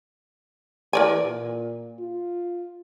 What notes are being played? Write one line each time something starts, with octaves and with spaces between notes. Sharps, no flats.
E3 A#4 D5 G#5
A#2
F4